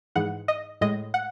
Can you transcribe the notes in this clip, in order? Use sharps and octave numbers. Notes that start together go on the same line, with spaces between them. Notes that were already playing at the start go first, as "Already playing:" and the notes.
G#2 E3 G#3 F#5
D#5
A2 G#3 D#5
F#5